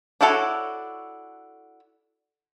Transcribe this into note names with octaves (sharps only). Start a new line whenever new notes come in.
D4 E4 F#4 A4 C#5